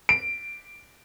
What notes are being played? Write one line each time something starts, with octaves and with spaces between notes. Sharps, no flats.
D7